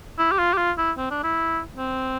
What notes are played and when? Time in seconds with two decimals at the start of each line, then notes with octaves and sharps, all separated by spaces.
0.18 E4
0.31 G4
0.38 F4
0.53 G4
0.58 F4
0.78 E4
0.97 C4
1.10 D4
1.24 E4
1.76 C4